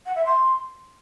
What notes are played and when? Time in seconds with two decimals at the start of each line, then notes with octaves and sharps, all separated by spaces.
0.06 F#5
0.15 E5
0.25 C6